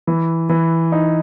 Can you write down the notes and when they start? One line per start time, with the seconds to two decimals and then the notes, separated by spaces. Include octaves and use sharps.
0.07 E3
0.49 E3
0.92 D#4